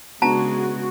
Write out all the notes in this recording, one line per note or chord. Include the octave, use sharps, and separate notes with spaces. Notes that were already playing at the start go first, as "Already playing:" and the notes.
C#3 G#3 B3 D4 F#4 A5 A#5